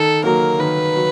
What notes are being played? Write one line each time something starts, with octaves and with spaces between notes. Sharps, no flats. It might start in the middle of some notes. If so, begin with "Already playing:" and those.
Already playing: D#3 A4
F#3 A#3 A#4
D#3 B4
F#3